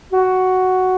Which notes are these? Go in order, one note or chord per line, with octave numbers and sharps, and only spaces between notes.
F#4